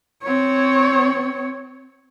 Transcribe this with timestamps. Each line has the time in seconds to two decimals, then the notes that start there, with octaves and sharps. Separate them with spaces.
0.23 C4 C#5